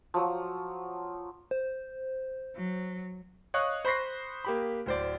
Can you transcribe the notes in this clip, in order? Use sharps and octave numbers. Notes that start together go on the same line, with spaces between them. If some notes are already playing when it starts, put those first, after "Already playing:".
F3 F#3
C5
F#3
C#5 D#5 F5 C#6 D#6 F#6
C5 B5 C#6 A#6 C7
A#3 G4 B5
D1 C5 D5